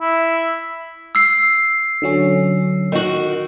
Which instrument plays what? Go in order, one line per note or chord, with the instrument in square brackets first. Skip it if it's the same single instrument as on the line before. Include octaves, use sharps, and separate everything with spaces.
[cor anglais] E4
[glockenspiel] E6 C7
[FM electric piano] D3 F#3 C#4
[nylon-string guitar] D#3 F#4